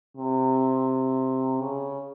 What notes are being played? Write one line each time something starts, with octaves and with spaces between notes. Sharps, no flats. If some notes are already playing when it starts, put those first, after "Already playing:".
C3
C#3